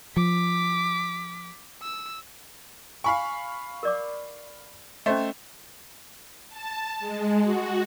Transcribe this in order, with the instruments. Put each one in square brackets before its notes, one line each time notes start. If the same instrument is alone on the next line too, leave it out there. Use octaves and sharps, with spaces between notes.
[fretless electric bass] F3 [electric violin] D6 B6
[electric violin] E6
[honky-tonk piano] F5 B5 C#6 [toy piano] G#5
[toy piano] A#4 D5 D6
[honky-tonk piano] A3 C5 [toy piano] C#4 D#5
[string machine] A5
G#3
F#4